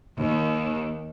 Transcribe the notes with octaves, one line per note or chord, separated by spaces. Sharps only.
D#2